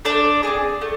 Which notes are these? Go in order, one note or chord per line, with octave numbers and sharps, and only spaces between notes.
A3 D4 D5
C4 E4 G#4
A3